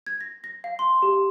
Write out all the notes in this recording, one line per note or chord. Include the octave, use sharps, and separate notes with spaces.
G#6
A#6
A#6
F5
C6
G4